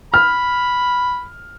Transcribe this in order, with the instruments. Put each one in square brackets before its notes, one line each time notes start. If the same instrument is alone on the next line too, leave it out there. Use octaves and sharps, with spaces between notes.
[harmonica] B5 [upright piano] F6